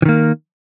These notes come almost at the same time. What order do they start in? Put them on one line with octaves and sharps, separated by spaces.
E3 D#3 A#3